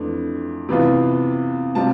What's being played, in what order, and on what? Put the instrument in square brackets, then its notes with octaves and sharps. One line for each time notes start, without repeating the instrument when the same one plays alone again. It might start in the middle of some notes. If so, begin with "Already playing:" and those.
Already playing: [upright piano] F2 E3 A3 D4
C3 E3 B3 F4
C3 G3 C4 F4 A5